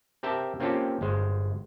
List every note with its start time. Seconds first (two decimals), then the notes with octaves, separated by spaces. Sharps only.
0.23 C4 G4 A#4 E5 G5 A5
0.60 A#3 C4 C#4 F4 G4 A4
1.01 G1 G#3 C5